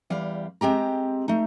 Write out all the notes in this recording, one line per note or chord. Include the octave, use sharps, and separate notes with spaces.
E2 G3 F5
G#3 C4 G4 A#5
A3 D#4